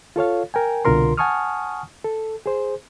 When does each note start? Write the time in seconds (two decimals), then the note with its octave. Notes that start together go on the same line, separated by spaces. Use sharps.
0.16 F4 A4 C#5 F5
0.54 A#4 G5 G#5
0.85 C2 B2 D3 F4 A#4 C6
1.18 F#5 G#5 A5 C#6 D#6 F6
2.04 A4
2.46 G#4 C5